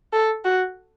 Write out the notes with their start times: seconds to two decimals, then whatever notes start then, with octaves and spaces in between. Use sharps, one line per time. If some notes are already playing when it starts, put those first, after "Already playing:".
0.13 A4
0.45 F#4